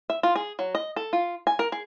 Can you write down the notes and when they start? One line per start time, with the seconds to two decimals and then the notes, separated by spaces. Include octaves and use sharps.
0.10 E5
0.23 F4
0.36 G#4
0.59 F#3
0.75 D#5
0.96 A4
1.13 F4
1.47 G#5
1.59 A#4
1.72 G#4